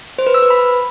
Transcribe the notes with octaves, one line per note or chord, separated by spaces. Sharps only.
C5
B4
E6
B4
B5